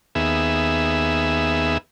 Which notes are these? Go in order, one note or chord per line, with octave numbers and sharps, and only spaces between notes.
D#2 B3 G#4 E5